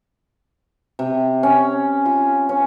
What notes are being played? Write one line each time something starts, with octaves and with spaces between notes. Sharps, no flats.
C3
C#4
F4
C#4